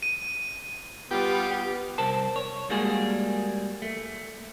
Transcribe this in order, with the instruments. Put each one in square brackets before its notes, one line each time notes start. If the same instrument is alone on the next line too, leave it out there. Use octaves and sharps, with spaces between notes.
[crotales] D#7
[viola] G3 F4 [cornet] B3 [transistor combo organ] G4
[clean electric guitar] C2 A#4 C5 A5
C#5
G3 G#3 A#3 D4 F#4 G#4
A3